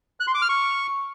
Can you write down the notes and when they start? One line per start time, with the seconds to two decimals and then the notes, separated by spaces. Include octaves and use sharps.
0.20 F#6
0.27 C6
0.34 D6
0.42 F6
0.49 C#6